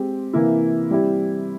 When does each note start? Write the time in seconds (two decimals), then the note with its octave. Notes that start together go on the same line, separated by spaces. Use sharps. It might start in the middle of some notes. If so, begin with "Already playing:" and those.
Already playing: G#3 C4 G4
0.33 C3 E3 A#3 E4
0.91 G3 C4 E4 G4